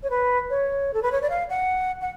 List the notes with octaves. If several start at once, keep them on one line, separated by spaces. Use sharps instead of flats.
C#5
B4
C#5
A4
B4
C#5
D5
F5
F#5
F#5